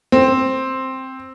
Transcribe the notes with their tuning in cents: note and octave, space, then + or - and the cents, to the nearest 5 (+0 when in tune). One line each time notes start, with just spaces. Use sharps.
C4 +5